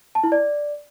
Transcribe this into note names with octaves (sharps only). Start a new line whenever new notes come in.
A5
E4
D5